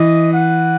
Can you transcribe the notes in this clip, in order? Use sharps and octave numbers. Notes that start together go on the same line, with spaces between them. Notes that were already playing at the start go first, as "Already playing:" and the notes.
Already playing: E3 D#5
F#5